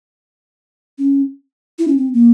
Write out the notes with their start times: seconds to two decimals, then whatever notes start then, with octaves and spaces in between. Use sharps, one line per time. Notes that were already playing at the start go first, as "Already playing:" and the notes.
0.99 C#4
1.79 E4
1.88 C#4
1.97 C4
2.14 A#3